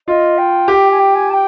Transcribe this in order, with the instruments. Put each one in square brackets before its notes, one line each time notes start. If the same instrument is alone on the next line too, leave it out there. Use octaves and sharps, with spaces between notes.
[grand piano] F4 [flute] D#5
[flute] G5
[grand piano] G4
[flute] G#5
G5
G#5
A5
G5